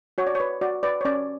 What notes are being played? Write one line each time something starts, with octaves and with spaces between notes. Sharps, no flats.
F#4 C#5
D5
C#5
B4
F#4 D5
B4 D5
C#5
C#4 D5